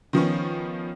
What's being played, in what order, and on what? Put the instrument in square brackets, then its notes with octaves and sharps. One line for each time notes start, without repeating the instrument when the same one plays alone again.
[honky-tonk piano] D#3 F3 B3 C#4